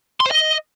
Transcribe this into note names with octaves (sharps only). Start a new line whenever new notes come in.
C6
C5
D#5